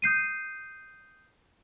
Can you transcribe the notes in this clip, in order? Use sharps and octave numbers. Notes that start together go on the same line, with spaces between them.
D#6 G6 C7 D#7